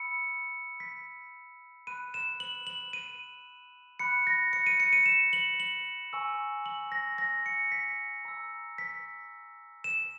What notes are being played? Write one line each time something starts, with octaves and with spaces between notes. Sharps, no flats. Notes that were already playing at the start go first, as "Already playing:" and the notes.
Already playing: B5 E6 C#7
B6
B5 F#6 D#7
E7
F#7
F#7
D#7
B5 F#6 C#7
A#6
C#7
D#7
C#7
D#7
E7
F#7
F#7
G#5 C#6 E6
F#7
A#6
A#6
C#7
B6
A#5 E6
B6
E7